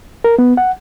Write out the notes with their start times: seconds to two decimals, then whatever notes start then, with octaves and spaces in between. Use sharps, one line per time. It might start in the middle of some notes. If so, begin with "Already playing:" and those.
0.24 A#4
0.38 B3
0.57 F#5